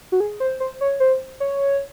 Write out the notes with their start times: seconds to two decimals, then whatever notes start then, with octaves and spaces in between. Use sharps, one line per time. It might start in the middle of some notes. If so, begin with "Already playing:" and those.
0.12 F#4
0.20 G#4
0.40 C5
0.60 C5
0.81 C#5
1.00 C5
1.40 C#5